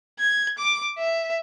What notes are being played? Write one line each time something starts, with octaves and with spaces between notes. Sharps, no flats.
G#6
D6
E5